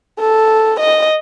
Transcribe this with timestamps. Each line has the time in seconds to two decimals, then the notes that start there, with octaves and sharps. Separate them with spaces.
0.20 A4
0.80 D#5